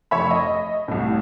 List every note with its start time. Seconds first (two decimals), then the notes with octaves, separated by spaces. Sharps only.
0.11 F1 C#5 E5 B5
0.31 D#5
0.88 C2 A2